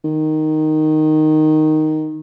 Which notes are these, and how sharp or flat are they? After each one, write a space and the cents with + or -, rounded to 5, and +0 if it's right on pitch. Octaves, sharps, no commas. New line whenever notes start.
D#3 -5